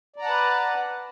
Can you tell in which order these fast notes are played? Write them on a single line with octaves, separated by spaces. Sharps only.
D5 A#5 F#5 A5 B4